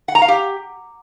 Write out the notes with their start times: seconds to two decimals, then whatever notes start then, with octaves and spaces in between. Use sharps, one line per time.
0.08 F#5
0.15 A#5
0.22 F5
0.28 G4